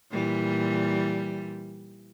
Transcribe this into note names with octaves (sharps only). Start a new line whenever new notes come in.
A#2 E3 G3